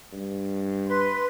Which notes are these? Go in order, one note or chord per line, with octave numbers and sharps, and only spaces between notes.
G2
B4 C6